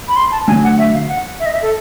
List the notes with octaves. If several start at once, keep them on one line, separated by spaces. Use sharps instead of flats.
B5
C6
A5
D3 F#3 A3 D4 G#5
F#5
E5
F5
F#5
E5
D#5
E5
A4